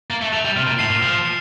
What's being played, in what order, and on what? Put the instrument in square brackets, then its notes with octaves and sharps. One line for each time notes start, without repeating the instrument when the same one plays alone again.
[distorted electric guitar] A#3 [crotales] A6
[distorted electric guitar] A3
[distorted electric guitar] A3 [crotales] D7 F7
[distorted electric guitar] G3
[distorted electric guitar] C3 [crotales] F6
[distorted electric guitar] A#2
[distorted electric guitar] A2 [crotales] C7 E7 G7
[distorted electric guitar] A#2
[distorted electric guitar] F3 [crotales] F6
[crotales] C7